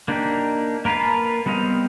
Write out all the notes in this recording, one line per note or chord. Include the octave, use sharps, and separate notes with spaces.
A#3 D4 D#4 G4
A#3 A#4 B4 F5 A5
G3 B3 C4 D#5 F5